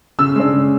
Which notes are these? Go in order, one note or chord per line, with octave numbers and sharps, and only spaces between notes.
C#3 E6
G#3 D4
C#3